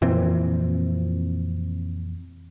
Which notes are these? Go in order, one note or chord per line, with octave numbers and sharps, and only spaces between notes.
F2 A#2 E3 C4